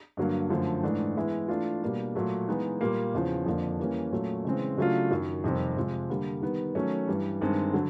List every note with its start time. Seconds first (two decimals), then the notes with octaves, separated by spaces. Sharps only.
0.17 G2 D3 F#3 A#3
0.50 F#2 D3 F3 A3
0.83 G#2 E3 A3 D4
1.17 E3 G#3 B3 E4
1.48 E3 A3 D4 F4
1.82 B2 G3 A#3 D4
2.15 A#2 F#3 A3
2.48 E3 G#3 B3 D#4
2.81 A#2 G3 A#3
3.14 E2 C#3 F3
3.46 F2 D3 F3 A#3 D4
3.79 E3 G3 A#3 C#4
4.12 A#2 F#3 A3 C#4
4.45 C#3 E3 G#3 C4
4.77 C#3 F#3 A3 D4 F4
5.11 F#2 D#3 F#3
5.44 F2 C3 D#3 G3 C4
5.77 C3 F3 G#3
6.10 D3 G3 A#3
6.42 D#3 G3 B3
6.75 D#3 F#3 A3 C#4
7.07 G2 E3 G3
7.41 G2 D#3 G#3 C4
7.73 D3 F#3